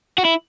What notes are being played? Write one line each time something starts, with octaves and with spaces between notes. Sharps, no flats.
F#4
E4